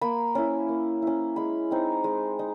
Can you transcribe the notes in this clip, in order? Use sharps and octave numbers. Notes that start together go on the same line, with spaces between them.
A#3 B5
C#4 E4
A#3
C#4 E4
G#3 B5
C4 D#4
G#3
D#4